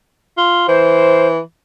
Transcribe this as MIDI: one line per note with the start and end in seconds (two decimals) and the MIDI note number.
0.38 0.66 65
0.68 1.40 52
0.68 1.28 72